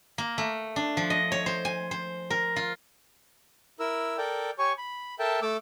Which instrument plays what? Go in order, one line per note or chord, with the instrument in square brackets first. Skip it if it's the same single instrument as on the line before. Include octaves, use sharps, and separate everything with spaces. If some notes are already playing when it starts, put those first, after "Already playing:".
[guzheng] A#3
A3
D4
F3
D#5
C#5
C5
G#5
C5
A#4
F4
[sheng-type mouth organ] E4 A#4 E6
A4 A#4 D5 G5
G4 C#5 G#5 C#6
B5
A4 A#4 E5 G5 A5
A3 A4 D6 E6